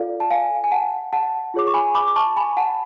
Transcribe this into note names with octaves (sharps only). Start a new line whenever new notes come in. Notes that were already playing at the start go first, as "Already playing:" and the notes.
Already playing: F4 A4 D5 F5
A5
F5 G#5
G#5
F#5 A5
F#5 A5
F4 G#4 C#5 D6
C#6
G#5 B5
B5 D6
D6
A5 C#6
G#5 B5
F#5 A5